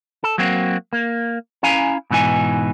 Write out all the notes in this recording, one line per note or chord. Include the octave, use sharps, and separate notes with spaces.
A4
F#3 A#3 C4 F#4
A#3
C#4 E4 F5 G#5 A#5
G#2 B2 E3 D#4 G#5